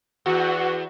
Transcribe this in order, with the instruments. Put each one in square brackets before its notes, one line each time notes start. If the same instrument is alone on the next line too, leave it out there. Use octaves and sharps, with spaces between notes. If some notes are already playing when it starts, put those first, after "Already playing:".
[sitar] E2 [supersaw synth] F#4